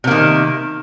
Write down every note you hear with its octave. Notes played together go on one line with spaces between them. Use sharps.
C3 D#3 A#3